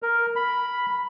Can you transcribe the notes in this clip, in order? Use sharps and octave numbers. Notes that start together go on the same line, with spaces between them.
A#4
B5